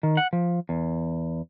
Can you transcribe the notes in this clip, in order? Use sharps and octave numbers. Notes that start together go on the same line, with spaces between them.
D#3
F#5
F3
E2